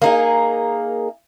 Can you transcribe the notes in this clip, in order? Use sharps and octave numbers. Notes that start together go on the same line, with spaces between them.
A#3 D#4 G#4